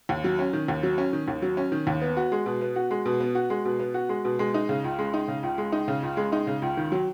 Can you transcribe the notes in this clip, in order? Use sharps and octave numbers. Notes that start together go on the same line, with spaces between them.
D#2
F#3
C#4
D#3
D#2
F#3
C#4
D#3
D#2
F#3
C#4
D#3
D#2
B3
F#4
G#3
B2
B3
F#4
G#3
B2
B3
F#4
G#3
B2
B3
F#4
G#3
B2
G#3
D#4
C#3
C#2
G#3
D#4
C#3
C#2
G#3
D#4
C#3
C#2
G#3
D#4
C#3
C#2
D#3
F#3